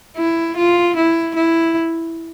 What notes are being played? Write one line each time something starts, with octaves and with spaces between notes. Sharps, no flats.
E4
F4
E4
E4